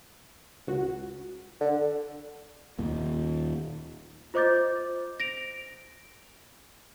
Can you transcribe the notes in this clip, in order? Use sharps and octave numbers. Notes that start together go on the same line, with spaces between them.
C#2 F#4
D3
D#2 A#2
F4 C5 D#5 D6 G6 A6
A#6 D7 F7